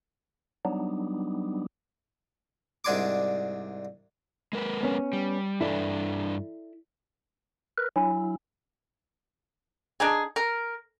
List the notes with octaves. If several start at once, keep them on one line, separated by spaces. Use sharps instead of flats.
F#3 G3 B3 D4 D#4
C2 G#2 D4 G#5 C6 D6
G#3 A#4 B4
B3 C#4
G3
G2 E3 D4 E4 A4 D5
A#4 B4
F#3 D4 E4
D4 D#4 G#4
A#4